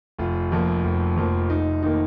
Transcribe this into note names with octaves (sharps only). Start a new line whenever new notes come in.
F1 F4
F2 F3 A#3
F1
F2 F3 A#3
F1 D#4
D#3 A#3 D#4